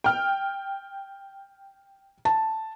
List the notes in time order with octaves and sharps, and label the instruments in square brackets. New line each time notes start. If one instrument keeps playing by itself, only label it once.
[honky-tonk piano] G5 F6
[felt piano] A5